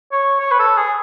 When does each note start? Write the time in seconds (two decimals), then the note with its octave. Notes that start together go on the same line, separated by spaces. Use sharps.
0.12 C#5
0.40 C#5
0.51 B4
0.59 A4
0.77 G#4